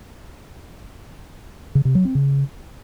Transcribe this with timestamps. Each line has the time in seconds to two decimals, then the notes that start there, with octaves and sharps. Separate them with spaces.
1.75 C#3
1.85 C3
1.95 F#3
2.05 C4
2.15 C#3